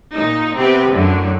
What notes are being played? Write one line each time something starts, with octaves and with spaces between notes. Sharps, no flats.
A#2 D#4
C3 B3 C4 G4 B4
F#2 A2 D3 F#3